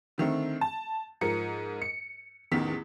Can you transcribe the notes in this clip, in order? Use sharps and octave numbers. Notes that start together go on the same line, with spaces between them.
D3 D#3 A3 C4
A5
G#2 F3 A#4 C#7
C#7
A1 E2 D#3 B6